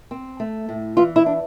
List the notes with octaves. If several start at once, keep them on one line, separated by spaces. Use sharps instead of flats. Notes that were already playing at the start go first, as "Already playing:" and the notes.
C4
A3
A2
E3 F4
E4
D4